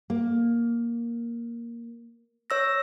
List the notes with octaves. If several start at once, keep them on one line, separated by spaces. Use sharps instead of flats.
A#3
C#5 E6 A#6